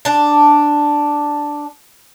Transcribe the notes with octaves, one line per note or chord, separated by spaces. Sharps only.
D4 A5